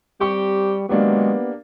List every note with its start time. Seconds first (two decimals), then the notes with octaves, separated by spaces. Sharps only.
0.21 G3 C4 G4 C#6
0.89 D#3 F#3 G#3 A#3 B3 D4 G4